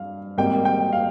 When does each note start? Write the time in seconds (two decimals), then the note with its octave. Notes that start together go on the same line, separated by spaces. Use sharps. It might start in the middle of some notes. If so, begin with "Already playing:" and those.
Already playing: G2 F5
0.37 G#1 G#2 G3 A#3 G5
0.65 G5
0.92 F5